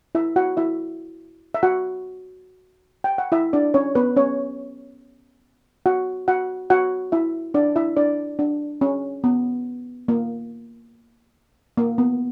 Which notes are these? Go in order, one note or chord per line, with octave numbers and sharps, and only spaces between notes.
E4 E5
F#4 F#5
E4 E5
E5
F#4 F#5
G5
F#5
E4 E5
D4 D5
C#4 C#5
B3 B4
C#4 C#5
F#4 F#5
F#4 F#5
F#4 F#5
E4 E5
D4 D5
E4 E5
D4 D5
D4
C#4
B3
A#3
A#3
B3